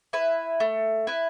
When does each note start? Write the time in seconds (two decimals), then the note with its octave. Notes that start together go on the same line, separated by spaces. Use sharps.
0.13 E4 B4
0.60 A3
1.07 E4 B4